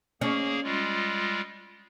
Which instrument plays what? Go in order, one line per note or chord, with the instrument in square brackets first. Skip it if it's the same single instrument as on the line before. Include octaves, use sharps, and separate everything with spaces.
[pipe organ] A#3 G#4 [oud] C#4
[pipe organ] G3 G#3 F4